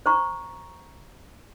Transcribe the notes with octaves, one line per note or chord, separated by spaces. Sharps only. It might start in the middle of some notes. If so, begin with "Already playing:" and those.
C5 A#5 C#6